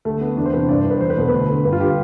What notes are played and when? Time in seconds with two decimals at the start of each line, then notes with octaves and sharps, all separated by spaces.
0.05 D2 A3
0.21 D3 B3
0.37 E2 D4
0.46 C5
0.53 C3 E3 B4
0.69 G2 D5
0.80 E3 C5
0.91 B4
1.01 E2 C5
1.10 B4
1.17 B2 A4
1.28 D2 B4
1.48 D3
1.65 G2 B4
1.72 F4
1.80 D3 G4